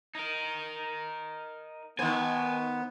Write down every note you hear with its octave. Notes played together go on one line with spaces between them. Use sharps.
D#4 A#4
D#3 B3 C5 G5 G#5